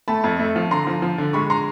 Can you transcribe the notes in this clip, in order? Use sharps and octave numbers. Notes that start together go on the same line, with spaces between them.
A3 A5 B5
F2
A3
F3
D3 A#5 C6
F3
F3
D3
G#3 B5 C#6
A#5 C6